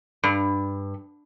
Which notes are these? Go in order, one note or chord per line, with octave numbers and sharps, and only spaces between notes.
G2